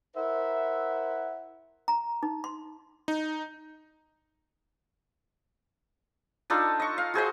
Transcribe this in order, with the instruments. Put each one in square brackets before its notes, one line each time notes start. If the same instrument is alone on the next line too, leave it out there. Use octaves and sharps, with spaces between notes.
[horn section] E4 A#4 C5 E5 F#5
[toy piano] A#5
D#4
C6
[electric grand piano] D#4
[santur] D4 D#4 F4 A4
D#5 C#6
F5
F#4 G#4 C5 D#5